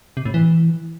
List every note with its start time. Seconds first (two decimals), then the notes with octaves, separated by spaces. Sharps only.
0.17 C3
0.25 A2
0.34 E3